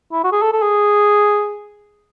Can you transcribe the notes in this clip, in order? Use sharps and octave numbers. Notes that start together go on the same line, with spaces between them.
E4
F#4
G#4
A4
A4
G#4